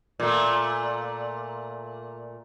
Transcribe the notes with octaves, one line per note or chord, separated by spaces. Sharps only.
A#2 A3